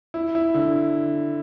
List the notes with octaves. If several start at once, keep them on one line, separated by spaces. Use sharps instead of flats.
E4
E4
D3